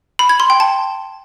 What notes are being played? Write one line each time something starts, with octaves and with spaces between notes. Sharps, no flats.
B5
G#6
C6
G5
A5